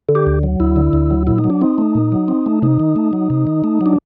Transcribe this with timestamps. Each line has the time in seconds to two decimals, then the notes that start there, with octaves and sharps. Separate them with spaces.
0.09 D3
0.15 G4
0.26 D2
0.43 F#3
0.60 D2 E4
0.76 D3
0.93 D2
1.11 F#3
1.27 A#2 E4
1.38 D#4
1.44 F#3
1.50 D4
1.61 C4 D#4
1.78 A3
1.95 A#2
2.12 F#3
2.28 C4
2.46 A3
2.62 C3 D#4
2.80 D#3
2.96 A3
3.13 F#3
3.30 C3
3.47 D#3
3.64 A3
3.81 F#3 D4